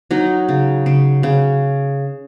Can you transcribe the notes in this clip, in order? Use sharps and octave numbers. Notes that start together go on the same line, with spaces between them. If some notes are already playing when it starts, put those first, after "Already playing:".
F#3 D#4
C#3
C#3
C#3